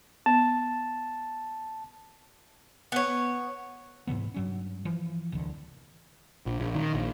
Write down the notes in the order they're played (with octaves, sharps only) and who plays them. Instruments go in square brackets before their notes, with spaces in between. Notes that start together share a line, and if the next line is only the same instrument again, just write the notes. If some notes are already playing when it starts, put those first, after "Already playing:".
[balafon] B3 [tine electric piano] A5
[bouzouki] B3 C#5
[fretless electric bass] G#2 C3 E3 B3
G2 F#3 C#4
E3 F3
D1 C2 D3 E3
[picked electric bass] A#1
A#1
D#3
A#1